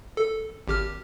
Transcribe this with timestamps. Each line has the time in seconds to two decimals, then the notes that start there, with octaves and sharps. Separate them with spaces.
0.17 A4
0.68 G#1 G4 F6